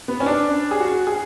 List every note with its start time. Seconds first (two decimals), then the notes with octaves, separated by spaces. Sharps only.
0.08 B3
0.20 C#4
0.26 D4
0.71 G#4
0.80 F#4
1.07 G#4